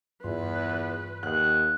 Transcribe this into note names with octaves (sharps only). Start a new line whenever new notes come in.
E2 G2 F4 B4 C6
D#2 F#5 D#6 F#6